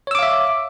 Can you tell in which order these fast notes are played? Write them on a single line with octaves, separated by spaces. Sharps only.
C#5 E6 D6 F5 E5